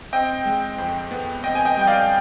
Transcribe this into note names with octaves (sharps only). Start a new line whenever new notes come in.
C4 D#5 G5
G#3
F2
B3
C4 D#5 G5
G#5
D#5 G5
G3 G5
D5 F5